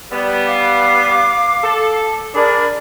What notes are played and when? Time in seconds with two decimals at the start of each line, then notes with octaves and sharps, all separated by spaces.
0.11 G3 B3
0.47 F5 D6
1.64 A4
2.34 D4 G#4 A#4 D5 B5